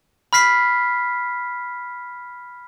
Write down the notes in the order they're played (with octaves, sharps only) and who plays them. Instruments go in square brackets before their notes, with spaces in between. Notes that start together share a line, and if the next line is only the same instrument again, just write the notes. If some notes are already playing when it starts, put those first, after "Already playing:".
[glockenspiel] B5 F6 B6 C7